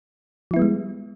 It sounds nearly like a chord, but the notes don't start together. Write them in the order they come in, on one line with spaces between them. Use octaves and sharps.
F3 E4 B3 G3 G#3